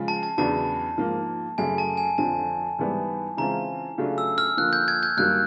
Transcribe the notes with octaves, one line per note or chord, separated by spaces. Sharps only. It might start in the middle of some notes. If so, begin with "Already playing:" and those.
Already playing: C#3 F3 G#3
A5
A5
E2 C#3 F#3 B3 D4 A5
G#2 F3 A#3
F#2 C#3 F#3 A3 G#5
A5
G#5
F2 D3 F3 A5
G#2 E3 G3 B3
C#3 E3 G#3 C4 F4 A#5
C#3 F#3 A3 D4 F4
E6
F6
D3 F3 A#3 F#6
G6
G#6
G6
G2 D#3 F#3 A#3 F#6